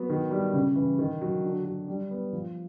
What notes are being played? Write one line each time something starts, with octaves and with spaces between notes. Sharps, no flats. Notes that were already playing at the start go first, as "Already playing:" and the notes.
Already playing: F#3 B3
D#3
G3
C#3
E3
D#3
F#3
D3
F#3
G3
B3
F3